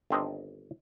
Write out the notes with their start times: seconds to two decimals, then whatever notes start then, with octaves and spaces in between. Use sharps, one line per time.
0.10 G1 D#3 C4 D4 A#4 D#5